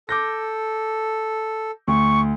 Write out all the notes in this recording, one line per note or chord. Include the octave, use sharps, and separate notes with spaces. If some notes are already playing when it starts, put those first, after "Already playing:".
A4 D6 G6 A#6
D2 C#6